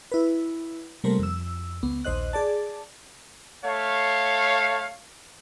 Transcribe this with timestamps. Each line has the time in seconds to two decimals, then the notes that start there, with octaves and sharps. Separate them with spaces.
0.12 E4 B4
1.04 C3 G3 A3 A#3 A#4 C5
1.19 F2 E6
1.83 C#2 B3
2.04 A#1 D#2 C5 D#5 F#6
2.33 G#4 D5 A5
3.65 A3 C#5 F5